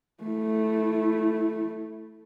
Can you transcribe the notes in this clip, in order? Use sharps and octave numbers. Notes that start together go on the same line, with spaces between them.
A3 E4